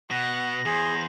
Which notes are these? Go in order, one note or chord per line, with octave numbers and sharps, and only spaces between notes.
B2 F#5 A#6
E2 G#4 C5